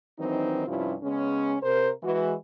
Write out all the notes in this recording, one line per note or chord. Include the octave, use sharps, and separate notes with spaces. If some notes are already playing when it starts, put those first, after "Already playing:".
D#3 E3 F#3 C4 D4 D#4
G2 C3 F3 C#4 E4 F4
C#3 G#3 B3 C#4
C3 A#4 C5
E3 G#3 F#4